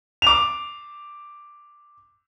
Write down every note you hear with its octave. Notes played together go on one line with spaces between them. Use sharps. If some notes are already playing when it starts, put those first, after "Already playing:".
D6 F7